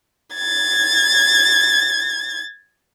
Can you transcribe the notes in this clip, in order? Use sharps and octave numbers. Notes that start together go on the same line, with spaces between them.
G#6 A6